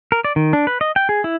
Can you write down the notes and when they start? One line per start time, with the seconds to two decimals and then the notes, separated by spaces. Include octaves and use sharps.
0.12 A#4
0.25 D5
0.36 D#3
0.53 D4
0.67 B4
0.81 D#5
0.96 G5
1.09 G#4
1.24 E4